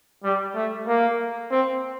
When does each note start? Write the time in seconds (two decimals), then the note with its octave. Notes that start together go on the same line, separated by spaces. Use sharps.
0.24 G3
0.55 A3
0.88 A#3
1.51 C4